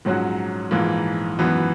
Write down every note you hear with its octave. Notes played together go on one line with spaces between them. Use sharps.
A#1 G#2 F#3 C#4 F#4
A#1 G#2 E3 A#3
G#1 F#2 E3 B3